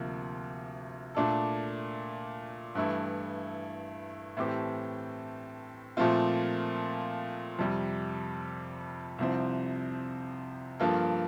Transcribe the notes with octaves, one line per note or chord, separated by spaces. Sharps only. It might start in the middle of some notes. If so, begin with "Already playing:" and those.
Already playing: D2 C3 F3 A#3
A#2 A3 D4 A4
G2 E3 A3 E4
A2 E3 A3 C4 G4
A#2 F3 A3 C4 F4
F2 C3 G3
C2 C3 F3 C4
G2 F3 A#3 F4 A4